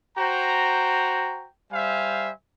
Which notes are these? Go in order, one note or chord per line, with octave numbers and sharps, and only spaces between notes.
F#4 C5 G5 A#5
G3 C5 E5 F5 G#5